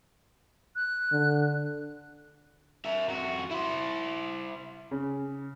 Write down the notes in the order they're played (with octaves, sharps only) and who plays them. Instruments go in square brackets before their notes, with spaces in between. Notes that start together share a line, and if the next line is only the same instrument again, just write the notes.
[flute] F#6
[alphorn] D3
[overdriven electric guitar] A#4 E5
F2 F#4
E4 C5
[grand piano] C#3